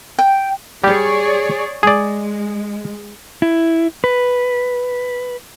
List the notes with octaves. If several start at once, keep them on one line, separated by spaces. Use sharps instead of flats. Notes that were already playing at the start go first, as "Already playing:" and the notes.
G5
G3 G4 G#4 C#5 D5
G#3 G#4 D5
E4
B4